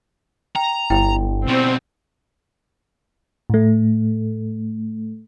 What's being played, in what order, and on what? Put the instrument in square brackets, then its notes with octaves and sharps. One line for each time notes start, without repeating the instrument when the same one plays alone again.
[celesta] G5 [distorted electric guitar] A#5
[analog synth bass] G1 [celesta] E4 G5
[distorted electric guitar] B2 G3 [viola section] C4
[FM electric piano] A2 A3